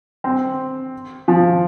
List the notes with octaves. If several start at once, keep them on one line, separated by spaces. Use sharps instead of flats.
C4
F3